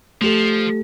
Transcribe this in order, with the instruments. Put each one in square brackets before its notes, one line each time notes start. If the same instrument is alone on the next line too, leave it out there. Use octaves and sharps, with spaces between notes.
[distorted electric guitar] F3 [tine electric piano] A3 G4 A4